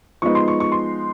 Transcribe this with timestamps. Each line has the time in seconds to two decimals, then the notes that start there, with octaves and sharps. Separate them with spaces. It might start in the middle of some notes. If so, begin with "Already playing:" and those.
0.22 F3 G#3 B3 D#4 C#6
0.35 C6
0.48 C#6
0.60 C#6
0.72 C6